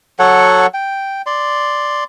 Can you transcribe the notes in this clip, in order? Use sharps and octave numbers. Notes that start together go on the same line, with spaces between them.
F#3 A4 C#5 F#5
G5
D5 C6